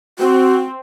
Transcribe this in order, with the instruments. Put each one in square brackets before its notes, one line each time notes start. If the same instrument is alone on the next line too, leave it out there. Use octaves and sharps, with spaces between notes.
[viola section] C4 [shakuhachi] F#4